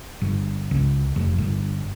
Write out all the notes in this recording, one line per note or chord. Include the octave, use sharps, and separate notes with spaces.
G1
C#2
F1
G1